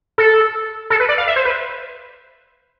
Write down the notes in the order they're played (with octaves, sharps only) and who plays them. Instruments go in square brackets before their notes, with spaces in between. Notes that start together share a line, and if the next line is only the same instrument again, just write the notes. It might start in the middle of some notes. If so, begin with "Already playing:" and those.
[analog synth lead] A4
A4
B4
D5
F5
E5
C5
B4